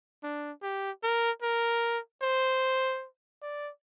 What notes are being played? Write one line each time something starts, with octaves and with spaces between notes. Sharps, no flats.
D4
G4
A#4
A#4
C5
D5